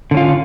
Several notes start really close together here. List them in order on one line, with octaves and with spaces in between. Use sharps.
D3 C#4 F4